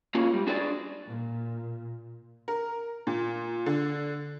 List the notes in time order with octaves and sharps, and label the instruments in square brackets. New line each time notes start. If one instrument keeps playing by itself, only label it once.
[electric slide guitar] A3 A#3 C#4 F4 F#4
G#2 G3
D4 F#4 G#4 C#5 D5
[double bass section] A#2
[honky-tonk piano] A#4
A#2
D3